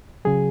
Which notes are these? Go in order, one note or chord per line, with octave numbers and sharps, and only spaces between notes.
C#3 F#3 G#4